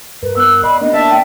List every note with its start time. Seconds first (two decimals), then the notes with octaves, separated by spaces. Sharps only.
0.23 G2 A#4 B4
0.36 B3 E6 F#6
0.63 D5 D#5 B5 C6
0.81 C3 A#3 B3 D4 D#4 D#5
0.94 A#3 D4 E4 D5 E5 A5
1.10 G5